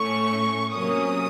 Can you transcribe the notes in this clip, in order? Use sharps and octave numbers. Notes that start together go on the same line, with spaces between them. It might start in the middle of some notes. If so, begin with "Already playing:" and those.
Already playing: A2 A3 C#4 C#6
C3 F#3 A#3 C#4 D#6